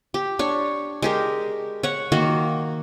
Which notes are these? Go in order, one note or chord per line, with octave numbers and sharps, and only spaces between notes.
G4
D4 C#5
G#3 G4 A#4
C#5 F#5
D#3 A#3 F#4